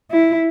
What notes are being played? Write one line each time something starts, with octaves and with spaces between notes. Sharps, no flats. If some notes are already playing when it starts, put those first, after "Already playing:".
E4